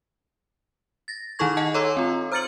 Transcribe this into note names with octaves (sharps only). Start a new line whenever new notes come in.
A6 A#6
D#3 D#4 E4 A4 C#6 G#6
D#5 F#5 G#5 A5
A4 C#5 A#5 C6 D6 E6
C4 F4
C5 A#5 F6 A6 C#7 F#7